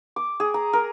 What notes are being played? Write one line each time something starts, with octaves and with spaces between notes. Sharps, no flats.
D6
G#4
A#5
A#4